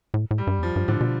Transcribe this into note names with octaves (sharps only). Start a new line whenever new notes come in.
A2
A2
G3
G2
E2
F2 F3
G2
A2 D3
B2